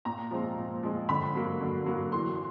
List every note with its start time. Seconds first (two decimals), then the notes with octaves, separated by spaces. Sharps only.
0.05 A#2 A#5
0.31 F3 G#3 C4
0.57 A#2
0.83 F3 G#3 C4
1.09 D3 B5
1.35 F#3 A#3
1.61 D3
1.86 F#3 A#3
2.12 E3 C6
2.35 C6